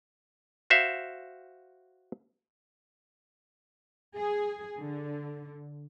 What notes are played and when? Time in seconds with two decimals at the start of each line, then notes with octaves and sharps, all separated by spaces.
0.70 F#4 C5 E5 F5
4.16 G#4
4.79 D3